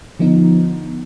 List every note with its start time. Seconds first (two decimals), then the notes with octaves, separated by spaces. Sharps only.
0.19 D3 F3 B3 D#4